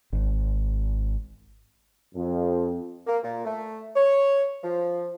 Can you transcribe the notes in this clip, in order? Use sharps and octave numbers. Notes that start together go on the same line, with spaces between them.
G#1
F2
A#3
A#2
A3
C#5
F3